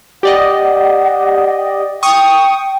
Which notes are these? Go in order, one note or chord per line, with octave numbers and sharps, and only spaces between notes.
G4 D5 D#5 F#5
G5 C#6 D#6